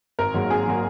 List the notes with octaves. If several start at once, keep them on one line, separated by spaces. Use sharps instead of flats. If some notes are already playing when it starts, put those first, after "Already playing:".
G#1 A#4
G#2 F#3 A#3
G#1 G#4
F#3 A#3